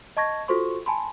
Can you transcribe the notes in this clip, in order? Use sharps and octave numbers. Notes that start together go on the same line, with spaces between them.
D#5 A5 C#6 G#6 A#6
F4 F#4 A4 C5 C6 C#6
G#5 A5 B5 C6